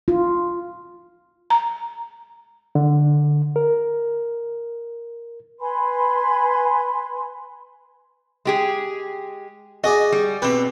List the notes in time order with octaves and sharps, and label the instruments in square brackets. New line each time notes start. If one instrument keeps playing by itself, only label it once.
[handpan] F4
[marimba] A#5
[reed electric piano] D3
A#4
[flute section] B4 G#5 B5 C6
[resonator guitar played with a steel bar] G#3 G4 G#4
[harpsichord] F#4 G#4 D5 [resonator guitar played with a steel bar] D#5
[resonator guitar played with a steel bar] G3
[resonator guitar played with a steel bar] B2 C4 [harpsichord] G4 B4